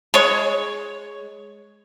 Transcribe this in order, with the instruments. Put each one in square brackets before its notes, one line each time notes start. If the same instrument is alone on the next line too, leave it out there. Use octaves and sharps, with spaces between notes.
[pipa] G#3 C#5